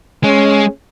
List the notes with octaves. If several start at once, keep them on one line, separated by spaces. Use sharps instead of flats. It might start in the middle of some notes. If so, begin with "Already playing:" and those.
G#3 C#4